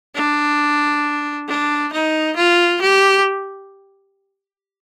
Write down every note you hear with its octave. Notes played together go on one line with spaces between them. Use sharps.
D4
D4
D#4
F4
G4